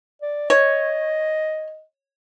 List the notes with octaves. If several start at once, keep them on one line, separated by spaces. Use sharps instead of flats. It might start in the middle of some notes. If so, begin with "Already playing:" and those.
D5
C#5 D#5